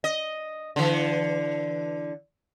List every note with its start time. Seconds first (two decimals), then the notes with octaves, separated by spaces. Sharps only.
0.04 D#5
0.76 D3 E3